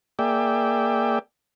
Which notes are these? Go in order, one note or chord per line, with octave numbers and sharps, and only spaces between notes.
A#3 G#4 D5 E5 G5